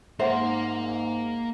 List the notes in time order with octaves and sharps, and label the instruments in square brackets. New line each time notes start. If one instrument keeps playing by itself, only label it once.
[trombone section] G#2 [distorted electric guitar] A#3 A#4 [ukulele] C5 [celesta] E5 F#5 C6